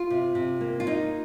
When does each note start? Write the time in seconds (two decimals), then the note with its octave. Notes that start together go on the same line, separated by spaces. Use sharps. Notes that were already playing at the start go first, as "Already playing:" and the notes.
Already playing: F4
0.10 C3
0.35 C3
0.61 A#3
0.80 F4
0.86 A#3 D#4